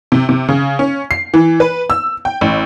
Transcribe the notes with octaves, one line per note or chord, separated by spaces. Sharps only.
C3
C3
C#3
C#4
C7
E3
B4
E6
G5
A1